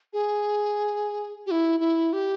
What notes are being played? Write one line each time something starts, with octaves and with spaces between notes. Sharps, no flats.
G#4
G4
E4
E4
G4